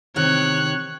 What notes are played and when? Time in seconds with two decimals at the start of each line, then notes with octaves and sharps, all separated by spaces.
0.16 C3 D#3 C#5 F#6